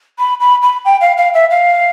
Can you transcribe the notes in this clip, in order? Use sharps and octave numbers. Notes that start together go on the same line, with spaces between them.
B5
B5
B5
G5
F5
F5
E5
F5